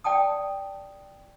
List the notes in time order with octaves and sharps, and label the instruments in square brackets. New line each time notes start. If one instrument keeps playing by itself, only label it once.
[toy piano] D5 G5 A5 D#6